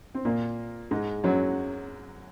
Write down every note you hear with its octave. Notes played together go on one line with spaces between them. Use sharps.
C4
A#2 A#3
G#2 G#3
F#2 F#3